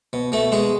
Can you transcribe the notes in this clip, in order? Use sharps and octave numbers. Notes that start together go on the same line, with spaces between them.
B2
B2 A3 A4
B2 G#3 G#4